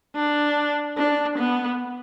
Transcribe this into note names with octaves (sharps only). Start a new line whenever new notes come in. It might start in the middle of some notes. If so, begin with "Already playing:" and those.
D4
D4
B3